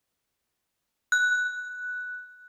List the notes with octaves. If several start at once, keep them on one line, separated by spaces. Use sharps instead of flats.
F#6